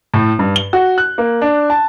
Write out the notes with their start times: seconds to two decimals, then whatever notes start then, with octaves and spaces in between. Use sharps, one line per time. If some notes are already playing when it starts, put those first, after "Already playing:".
0.14 A2
0.39 G2
0.56 G7
0.73 F#4
0.98 F#6
1.18 A#3
1.41 D4
1.70 A5